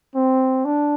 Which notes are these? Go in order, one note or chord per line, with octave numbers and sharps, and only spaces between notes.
C4
D4